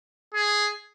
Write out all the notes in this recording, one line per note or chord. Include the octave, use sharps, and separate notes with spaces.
G#4